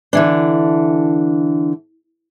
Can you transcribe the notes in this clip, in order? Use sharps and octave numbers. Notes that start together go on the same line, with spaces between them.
D3 E3 D4